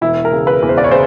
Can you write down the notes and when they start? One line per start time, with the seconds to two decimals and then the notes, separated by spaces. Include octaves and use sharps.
0.01 E1 E4
0.25 A#4
0.32 C#3
0.47 B4
0.62 E2
0.69 C5
0.78 D5
0.84 C#5
0.91 C#3 C5